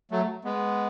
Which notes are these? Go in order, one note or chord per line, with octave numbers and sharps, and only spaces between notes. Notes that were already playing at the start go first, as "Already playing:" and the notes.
F#3 A3
G#3 B3